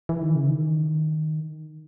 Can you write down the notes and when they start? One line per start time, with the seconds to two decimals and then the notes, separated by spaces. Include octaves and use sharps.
0.09 E3
0.22 D#3
0.35 C#3
0.49 D#3